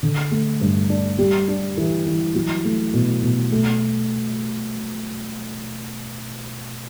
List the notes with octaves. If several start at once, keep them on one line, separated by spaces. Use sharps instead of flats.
D3
A3
G2
D4
G3
D4
E3
E3
F#3
A3
B2
B2
A3